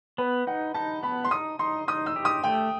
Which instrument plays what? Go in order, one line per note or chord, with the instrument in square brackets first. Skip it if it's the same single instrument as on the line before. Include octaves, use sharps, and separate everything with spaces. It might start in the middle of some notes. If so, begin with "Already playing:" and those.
[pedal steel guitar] B3 [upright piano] B4
[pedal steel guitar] D#4 [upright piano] F#5
[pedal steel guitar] D#4 [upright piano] A5
[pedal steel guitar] B3 [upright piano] B5
[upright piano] C6
[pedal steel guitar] D#4 [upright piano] D#6
[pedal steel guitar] D#4 [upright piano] C6
[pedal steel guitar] D#4 [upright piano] D#6
[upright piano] E6
[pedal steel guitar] G4
[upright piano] D#6
[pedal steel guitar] A3 [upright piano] G5